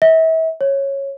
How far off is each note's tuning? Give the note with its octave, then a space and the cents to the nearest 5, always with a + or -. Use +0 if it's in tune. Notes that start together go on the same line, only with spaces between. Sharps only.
E5 -35
C#5 -10